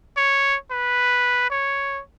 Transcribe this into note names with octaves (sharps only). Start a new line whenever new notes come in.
C#5
B4
C#5